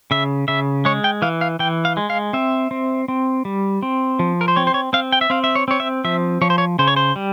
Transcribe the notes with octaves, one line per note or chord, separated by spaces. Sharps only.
C#3 E5
C#3 E5
G#3 C#5
G5
E3 F5
F5
E3 G5
F5
G#3
F5
C4 E5
C4
C4
G3
C4
F3
A#4
C5
C4 C#5
C5
C#5
C4 F5
G5
E5
C4 F5
E5
C#5
C4 C#5
E5
F3 E5
F3 C#5
C5
C#5
C#3 C5
C#5
C5
G3